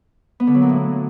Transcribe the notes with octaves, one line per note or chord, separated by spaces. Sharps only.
B3
D3
F#3
A#2
A2